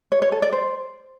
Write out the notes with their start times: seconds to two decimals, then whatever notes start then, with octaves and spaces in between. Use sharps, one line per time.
0.12 C#5
0.22 C#5
0.32 A4
0.42 D5
0.53 C5